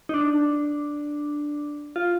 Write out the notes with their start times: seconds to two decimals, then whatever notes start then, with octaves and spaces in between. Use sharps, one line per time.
0.09 D#4
0.14 D4
1.96 F4